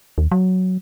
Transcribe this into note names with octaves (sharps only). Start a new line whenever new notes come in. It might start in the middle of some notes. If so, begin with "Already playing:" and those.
D#2
F#3